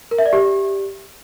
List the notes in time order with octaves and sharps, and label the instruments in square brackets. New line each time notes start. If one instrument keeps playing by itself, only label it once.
[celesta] A#4
E5
D5
G4